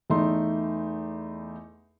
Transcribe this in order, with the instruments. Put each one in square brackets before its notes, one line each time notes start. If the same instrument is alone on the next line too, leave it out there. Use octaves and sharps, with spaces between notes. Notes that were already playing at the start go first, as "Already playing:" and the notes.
[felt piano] E2 A3 D#4 C6